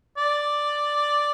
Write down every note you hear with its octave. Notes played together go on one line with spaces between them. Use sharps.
D5